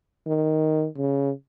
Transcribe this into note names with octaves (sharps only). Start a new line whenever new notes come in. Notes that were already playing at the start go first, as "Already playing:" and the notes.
D#3
C#3